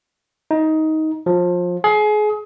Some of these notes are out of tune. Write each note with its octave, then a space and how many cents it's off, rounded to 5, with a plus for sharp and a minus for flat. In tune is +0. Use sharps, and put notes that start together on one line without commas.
D#4 +15
F3 +25
G#4 +30